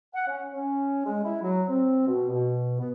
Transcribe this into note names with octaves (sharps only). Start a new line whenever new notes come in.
F#5
C#4
C#4
G#3
E4
F#3
C4
B2
B2
B3